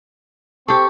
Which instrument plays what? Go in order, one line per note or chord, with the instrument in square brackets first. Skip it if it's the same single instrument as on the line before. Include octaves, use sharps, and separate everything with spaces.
[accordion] C4 C#6 [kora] G4 A4